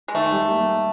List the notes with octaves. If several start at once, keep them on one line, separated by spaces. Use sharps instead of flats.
G#3
D#3 A3
G3
A#3